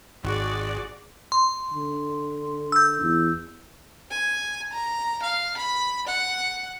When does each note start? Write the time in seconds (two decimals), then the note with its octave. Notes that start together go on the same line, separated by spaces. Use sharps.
0.24 G#1 F#4 G#4 D5
1.32 C6
1.74 D3
2.72 E6 G6
3.01 E2
4.11 G#5
4.73 A#5
5.23 F5
5.57 B5
6.07 F#5